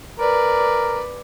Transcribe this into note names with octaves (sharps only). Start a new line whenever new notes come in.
A#4 B4 D5